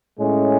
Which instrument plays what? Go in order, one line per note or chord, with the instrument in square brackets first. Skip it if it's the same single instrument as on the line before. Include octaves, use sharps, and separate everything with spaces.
[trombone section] A2 G#3 C#4